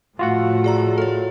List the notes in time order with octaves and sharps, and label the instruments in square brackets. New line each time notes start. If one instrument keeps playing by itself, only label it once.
[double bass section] A2 F3 A3 [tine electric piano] F4 F#4 F#5
[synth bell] G#4 D5 A#5
A4 C#5